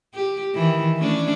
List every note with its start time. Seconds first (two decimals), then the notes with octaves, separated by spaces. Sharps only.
0.15 G4
0.54 D#3 E3
0.97 A3 C#4 D4